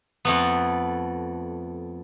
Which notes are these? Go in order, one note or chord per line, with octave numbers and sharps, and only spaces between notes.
F2 A3 B3